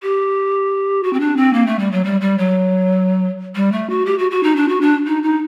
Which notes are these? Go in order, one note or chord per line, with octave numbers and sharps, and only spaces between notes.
G4
F#4
C4
D4
C4
A#3
A3
G3
F#3
G3
G3
F#3
G3
A3
F#4
G4
F#4
F#4
D#4
D4
F#4
D4
D#4
D#4